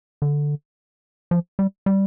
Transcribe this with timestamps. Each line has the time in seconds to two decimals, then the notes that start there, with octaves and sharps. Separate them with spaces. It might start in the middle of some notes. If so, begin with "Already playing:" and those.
0.22 D3
1.31 F3
1.59 G3
1.86 G3